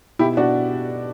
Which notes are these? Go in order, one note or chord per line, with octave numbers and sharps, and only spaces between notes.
B2 E4 G4
B2 D4 F#4